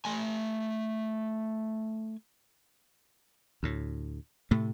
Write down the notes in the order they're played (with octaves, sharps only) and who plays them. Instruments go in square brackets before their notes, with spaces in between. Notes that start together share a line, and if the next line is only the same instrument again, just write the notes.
[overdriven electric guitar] A3 G#5
[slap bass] D2 A2
A2 C3 A3